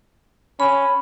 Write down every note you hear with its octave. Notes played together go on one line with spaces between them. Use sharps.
C#4 B5